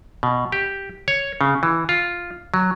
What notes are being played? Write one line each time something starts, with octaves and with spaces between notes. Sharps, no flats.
B2
G4
C#5
C#3
E3
F4
F#3